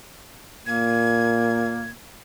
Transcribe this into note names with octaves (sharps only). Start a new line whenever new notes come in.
A#2 A#3 G#6